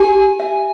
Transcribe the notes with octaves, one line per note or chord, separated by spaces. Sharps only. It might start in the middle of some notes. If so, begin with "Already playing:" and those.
Already playing: G4 G#5
E5 G#5